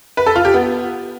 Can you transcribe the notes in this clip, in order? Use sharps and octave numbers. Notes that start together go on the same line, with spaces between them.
B4
A4
F4
G4
B3